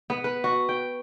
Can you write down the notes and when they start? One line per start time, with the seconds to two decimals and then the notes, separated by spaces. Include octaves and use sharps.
0.10 B3
0.24 B4
0.44 F#4
0.69 G5